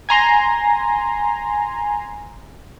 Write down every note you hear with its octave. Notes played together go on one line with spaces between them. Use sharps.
G#5 A#5 C6